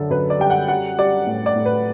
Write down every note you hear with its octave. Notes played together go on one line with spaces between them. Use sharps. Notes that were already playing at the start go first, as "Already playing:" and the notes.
Already playing: F#2 D3 A4
F#2 B4
D5
G3 G5
F#5
G3 F#5
G3 D5
A2
D5
A2
B4